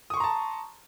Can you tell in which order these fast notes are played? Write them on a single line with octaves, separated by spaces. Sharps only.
D#6 C#6 C6 A#5 A5